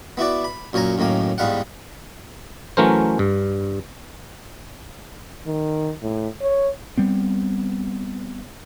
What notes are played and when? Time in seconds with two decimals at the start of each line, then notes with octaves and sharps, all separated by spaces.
0.17 B3 E4 F#4 D5
0.44 B5
0.73 F#2 A#2 C#5 G#5 A#5
0.98 F#2 A2 D#3 A#3 G#5
1.38 E2 G#2 G3 F5 F#5
2.77 E3 F#3 A3 C#4 A#4 C5
3.19 G2
5.47 D#3
6.02 A2
6.41 C#5
6.97 G3 B3 C4